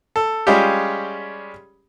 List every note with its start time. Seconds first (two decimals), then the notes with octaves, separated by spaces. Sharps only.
0.16 A4
0.47 G3 G#3 C#4 F4 G4